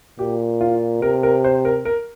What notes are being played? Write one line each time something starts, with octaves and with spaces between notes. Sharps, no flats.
A#2 G4
F4
C3 A#4
A#4
C5
A#4
A#4